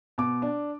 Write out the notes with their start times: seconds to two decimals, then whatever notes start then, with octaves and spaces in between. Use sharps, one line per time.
0.18 B2 D6
0.42 D4